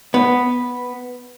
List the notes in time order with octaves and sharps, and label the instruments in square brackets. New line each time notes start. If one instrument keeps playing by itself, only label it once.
[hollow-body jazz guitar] B3